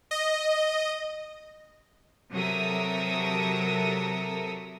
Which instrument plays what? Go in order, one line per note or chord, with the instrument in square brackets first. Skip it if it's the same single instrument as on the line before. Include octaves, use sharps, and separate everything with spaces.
[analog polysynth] D#5
[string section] C3 F#3 A4 A#4 E5 D#6